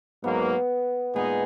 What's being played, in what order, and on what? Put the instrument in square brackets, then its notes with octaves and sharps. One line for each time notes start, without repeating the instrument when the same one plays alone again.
[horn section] G#2 F#3 A#3 [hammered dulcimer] B3
[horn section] A#2 G#3 D#4 G#4 [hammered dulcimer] B3